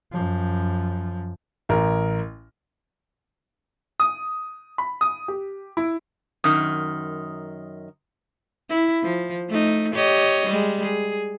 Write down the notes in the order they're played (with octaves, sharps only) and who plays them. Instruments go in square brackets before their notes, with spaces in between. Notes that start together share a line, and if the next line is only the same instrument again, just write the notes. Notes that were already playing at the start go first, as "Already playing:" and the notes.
[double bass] F#2 F3
[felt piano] A1 A#4
[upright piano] D#6
B5
D#6
G4
E4
[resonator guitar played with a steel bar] F#2 D#3 [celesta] D#6
[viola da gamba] E4
F3
A3 D#4
G4 C#5 D#5
G3 G#3
G#4